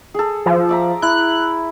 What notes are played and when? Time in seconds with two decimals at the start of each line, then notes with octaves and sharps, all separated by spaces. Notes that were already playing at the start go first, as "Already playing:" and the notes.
0.14 G#4 A4
0.46 F3
0.69 D5 E5 A#5
1.02 E4 F#6